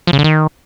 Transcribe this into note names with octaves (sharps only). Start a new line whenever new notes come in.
F3
C#3
D3
D#3